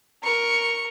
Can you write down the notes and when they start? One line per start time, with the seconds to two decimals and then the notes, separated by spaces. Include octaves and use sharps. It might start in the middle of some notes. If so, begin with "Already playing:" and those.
0.24 A#4 C#6